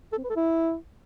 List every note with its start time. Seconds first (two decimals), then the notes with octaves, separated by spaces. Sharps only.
0.12 A4
0.18 C4
0.24 B4
0.30 A4
0.36 E4